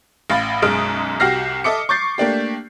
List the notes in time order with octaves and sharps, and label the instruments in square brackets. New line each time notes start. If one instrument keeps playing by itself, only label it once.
[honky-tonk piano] A1 F5 B5 A6
B1 F#2 G#3 D#6 F6 D7
C2 F#4 G4 F6 A#6 C7
A4 D#5 E5 D6 C#7
C#6 D6 G6 A6 C7
A3 A#3 D4 G4